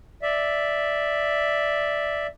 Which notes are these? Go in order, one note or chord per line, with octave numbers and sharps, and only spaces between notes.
D5 E5